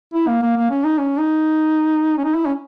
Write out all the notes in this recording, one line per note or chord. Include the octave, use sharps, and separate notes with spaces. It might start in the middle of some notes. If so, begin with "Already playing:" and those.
E4
A#3
A#3
A#3
C#4
D#4
C#4
D#4
C#4
D#4
E4
C#4